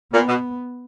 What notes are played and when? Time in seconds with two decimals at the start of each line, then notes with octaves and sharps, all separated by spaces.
0.13 A#2 B3
0.28 B2